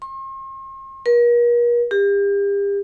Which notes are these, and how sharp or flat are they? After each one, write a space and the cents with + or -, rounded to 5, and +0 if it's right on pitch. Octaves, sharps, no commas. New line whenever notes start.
C6 +45
A#4 +40
G4 +40